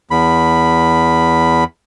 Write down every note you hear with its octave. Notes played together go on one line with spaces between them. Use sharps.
E2 B5